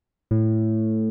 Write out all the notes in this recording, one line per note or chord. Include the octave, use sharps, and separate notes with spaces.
A2